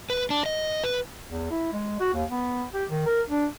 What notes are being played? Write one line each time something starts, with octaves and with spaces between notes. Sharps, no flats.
B4
D4
D#5
B4
E2
E4
G#3
F#4
D#2
B3
G4
D#3
A#4
D4